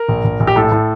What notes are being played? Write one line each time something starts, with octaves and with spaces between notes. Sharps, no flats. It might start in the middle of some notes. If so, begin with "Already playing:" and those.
Already playing: A#4
A#1
A#1
A#1
G4
A2 A4
A2